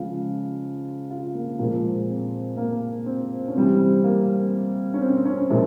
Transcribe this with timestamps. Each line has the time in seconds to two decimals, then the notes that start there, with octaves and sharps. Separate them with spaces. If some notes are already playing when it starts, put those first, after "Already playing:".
Already playing: C#3 F3 G#3 F4
1.10 F4
1.35 A#3
1.59 A#2 F3 G#3 A#3
2.09 C4
2.57 A#3
3.06 C4
3.48 C#4
3.55 C3 E3 G3 C4
4.04 A#3
4.94 C#4
5.01 C4
5.16 C4
5.25 C#4
5.50 A#2 F3 G#3 E4